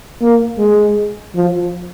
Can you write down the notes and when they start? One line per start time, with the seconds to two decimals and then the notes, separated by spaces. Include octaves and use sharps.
0.22 A#3
0.58 G#3
1.35 F3